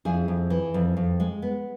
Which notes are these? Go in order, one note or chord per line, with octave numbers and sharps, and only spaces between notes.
F2 E4 G#4
F2
E3
F2
F2
G#3
B3